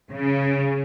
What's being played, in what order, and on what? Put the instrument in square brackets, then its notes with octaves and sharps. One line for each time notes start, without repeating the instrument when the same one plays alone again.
[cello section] C#3